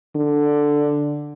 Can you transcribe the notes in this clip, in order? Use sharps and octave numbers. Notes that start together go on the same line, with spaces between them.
D3